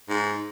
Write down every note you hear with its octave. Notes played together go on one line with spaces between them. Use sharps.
G#2